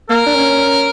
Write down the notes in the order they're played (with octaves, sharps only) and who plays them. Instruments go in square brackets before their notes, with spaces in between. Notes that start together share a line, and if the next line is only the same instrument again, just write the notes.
[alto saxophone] A#3 [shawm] A#4
[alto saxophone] D4
C#4